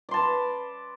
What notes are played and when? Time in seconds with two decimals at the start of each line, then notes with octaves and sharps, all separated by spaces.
0.09 D5
0.11 C6
0.14 A5
0.16 B4